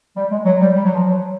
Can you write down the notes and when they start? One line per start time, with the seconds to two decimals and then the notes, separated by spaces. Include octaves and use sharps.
0.17 G3
0.31 G#3
0.45 F#3
0.60 G3
0.75 G3
0.84 F#3
0.94 F3
1.04 F#3